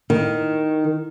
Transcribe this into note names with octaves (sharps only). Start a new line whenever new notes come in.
D#3